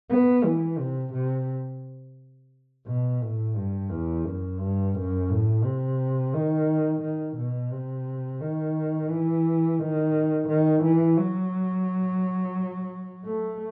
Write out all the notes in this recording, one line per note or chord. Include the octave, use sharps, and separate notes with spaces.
B3
E3
C3
C3
B2
A2
G2
E2
F#2
G2
F#2
A2
C3
D#3
D#3
B2
C3
D#3
E3
D#3
D#3
E3
F#3
A3